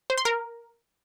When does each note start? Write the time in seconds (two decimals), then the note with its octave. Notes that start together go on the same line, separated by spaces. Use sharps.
0.10 C5
0.18 C6
0.25 A#4